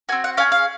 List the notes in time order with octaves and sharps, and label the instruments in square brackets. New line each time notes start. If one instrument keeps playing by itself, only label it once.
[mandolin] F#4 G#5
C4
F#5
C#4 G#4 F5
F5